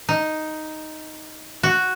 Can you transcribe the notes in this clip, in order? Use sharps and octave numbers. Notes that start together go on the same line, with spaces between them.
D#4
F#4